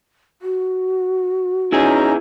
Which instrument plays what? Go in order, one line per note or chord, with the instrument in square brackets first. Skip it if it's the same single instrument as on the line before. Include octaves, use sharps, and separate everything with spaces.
[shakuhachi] F#4
[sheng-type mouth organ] C#4 D#4 A#5 [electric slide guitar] E4 G#4 G#5